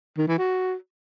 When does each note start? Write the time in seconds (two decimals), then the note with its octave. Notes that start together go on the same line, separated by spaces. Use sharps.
0.17 D#3
0.28 E3
0.38 F#4